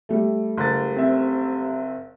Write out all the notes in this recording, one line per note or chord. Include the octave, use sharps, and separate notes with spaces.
G3 A3
F#1 A6
C4 E5